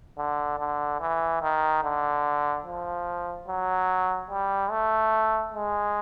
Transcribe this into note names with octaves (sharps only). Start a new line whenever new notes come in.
D3
D3
E3
D#3
D3
F3
F#3
G3
A3
G#3